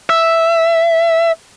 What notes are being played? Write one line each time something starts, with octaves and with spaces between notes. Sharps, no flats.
E5